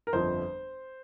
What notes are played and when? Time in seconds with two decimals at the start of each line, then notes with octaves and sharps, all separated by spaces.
0.07 A#4
0.13 G1 F2 F3 C5